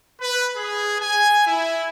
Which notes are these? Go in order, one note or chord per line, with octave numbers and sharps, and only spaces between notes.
B4
G#4
G#5
E4